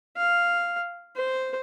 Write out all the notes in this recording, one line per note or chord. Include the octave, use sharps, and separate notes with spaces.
F5
C5